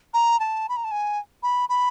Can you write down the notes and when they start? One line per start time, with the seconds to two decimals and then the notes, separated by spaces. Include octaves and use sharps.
0.14 A#5
0.40 A5
0.69 B5
0.77 A#5
0.84 A5
0.91 G#5
1.43 B5
1.69 B5